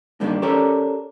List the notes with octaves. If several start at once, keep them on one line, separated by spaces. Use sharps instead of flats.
G2 D#3 G3 A#3 C4 D4
C#4 G4 A4 A#4 C#5 D5